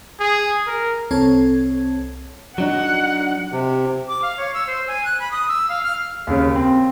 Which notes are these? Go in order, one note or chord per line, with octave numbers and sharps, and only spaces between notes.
G#4
A#4
C2 C4 A4 C#5 A5 G#6
F#3 D4 D#4 F#5
C3
D6
F5
C#5
E6
C5
G#5
F#6
B5
D#6
E6
F5
F6
D#2 C#3
C4